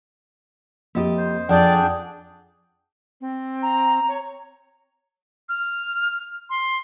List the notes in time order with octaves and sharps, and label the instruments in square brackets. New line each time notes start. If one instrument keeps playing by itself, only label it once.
[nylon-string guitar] F2 F#4 G4 [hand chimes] A#3 D#5 D#6
[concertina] C5
[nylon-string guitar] F2 [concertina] D4 G#4 G5 [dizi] D5 [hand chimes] F#5 G6
[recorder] C4
[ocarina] A#5
[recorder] C#5
[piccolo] F6
C6